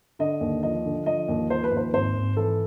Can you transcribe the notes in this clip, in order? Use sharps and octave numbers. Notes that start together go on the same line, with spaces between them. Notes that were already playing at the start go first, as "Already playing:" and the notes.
D3 D#5
D#2
F3 D#5
D3
F3 D#5
D#2
F3 C5
B4
D#2
C5
G#1 C5
G#1
E3 A4